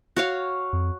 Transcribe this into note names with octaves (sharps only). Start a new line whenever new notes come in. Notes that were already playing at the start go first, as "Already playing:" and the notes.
F#4 C#5 F5
F2